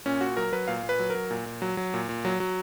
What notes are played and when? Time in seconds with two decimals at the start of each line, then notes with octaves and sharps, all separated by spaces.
0.06 A#2 C#4
0.21 A#2 F#4
0.37 F#3 A#4
0.52 F#3 B4
0.67 A#2 F5
0.83 A#2
0.89 B4
0.99 F#3
1.10 F#3 A#4
1.31 A#2
1.46 A#2
1.62 F#3
1.77 F#3
1.94 A#2
2.09 A#2
2.25 F#3
2.40 F#3